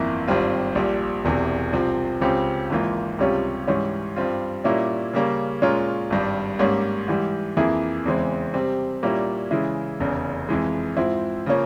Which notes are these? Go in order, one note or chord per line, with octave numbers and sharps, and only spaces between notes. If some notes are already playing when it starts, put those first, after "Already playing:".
Already playing: G1 F2 E3 A#3 E4
G#1 G2 G3 C4 F4
A#1 A#2 G3
E1 E2 C3 E3
C2 C3 F3 C4
C#2 C#3 F3 C4 G4
G#1 G#2 E3 A#3 F4
C#2 C3 G3 C#4 F4
G#2 E3 G3 C#4
G2 G3 C4 F4
A#2 G3 A#3 C#4 E4
C#3 G3 A#3 C#4
A#2 G#3 C#4 F4 A#4
G#1 G2 G3
G#2 G3 A#3 C#4
G#2 E3 G3
F2 E3 A#3 E4 G#4
E2 C#3 E3 G#3 C4
C3 G3 C4
A#2 G3 A#3 C#4 E4
C#3 E3 G#3 E4
F1 E2 C#3
F2 E3 G#3
G#2 F3 C4 E4
C#3 F3 A#3 C#4